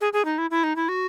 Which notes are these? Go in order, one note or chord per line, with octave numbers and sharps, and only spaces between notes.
G#4
G#4
D#4
E4
E4
D#4
E4
F#4